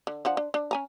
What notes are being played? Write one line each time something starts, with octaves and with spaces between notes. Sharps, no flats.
D3
F3 D4 F#5
D4
D4
C#4 G#5 A#5